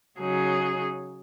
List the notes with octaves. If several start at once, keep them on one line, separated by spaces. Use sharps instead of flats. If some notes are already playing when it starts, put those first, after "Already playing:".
C#3 F#3 D#4 G#4